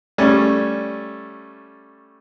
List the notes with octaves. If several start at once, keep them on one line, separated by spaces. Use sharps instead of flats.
G3 A3 C#4